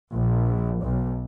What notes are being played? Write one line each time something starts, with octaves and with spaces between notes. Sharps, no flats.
A#1
B1